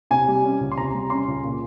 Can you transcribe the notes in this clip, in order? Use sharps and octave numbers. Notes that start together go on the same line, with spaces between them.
C3 G#5
G3
C#4
C#2
C6
C3 A#5
G3
C#4 C6
C#2
A#2